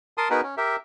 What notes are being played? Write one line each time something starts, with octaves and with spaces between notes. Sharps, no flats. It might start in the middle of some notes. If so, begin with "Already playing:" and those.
A#4 A5 C6 D#6
B3 D#4 F#4 G#4 A#4 B4
C#4
G4 A#4 E5